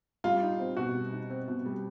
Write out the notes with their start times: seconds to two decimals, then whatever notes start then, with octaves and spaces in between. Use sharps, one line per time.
0.24 G3 F4
0.42 D#4
0.60 C4
0.77 B2 F#4
0.95 G3
1.12 D#4
1.30 C4
1.48 B2
1.66 G3